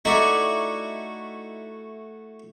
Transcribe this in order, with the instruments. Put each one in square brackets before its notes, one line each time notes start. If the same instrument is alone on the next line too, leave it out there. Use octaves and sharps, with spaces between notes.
[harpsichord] A3 E4 F#4 [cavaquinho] D#4 D5 C#6